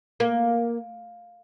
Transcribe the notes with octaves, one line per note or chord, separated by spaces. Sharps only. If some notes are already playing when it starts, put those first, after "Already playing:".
A#3